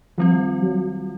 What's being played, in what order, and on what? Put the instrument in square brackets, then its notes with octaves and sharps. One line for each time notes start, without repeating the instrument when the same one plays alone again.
[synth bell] D#3 G3 C4 F4 [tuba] F3
[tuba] F#3